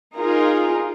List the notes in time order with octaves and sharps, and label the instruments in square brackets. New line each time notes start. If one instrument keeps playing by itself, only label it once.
[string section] D#4 F4 G#4 A#4